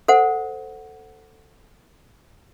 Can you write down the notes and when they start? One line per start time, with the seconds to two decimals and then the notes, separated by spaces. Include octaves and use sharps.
0.08 A4 C5 F#5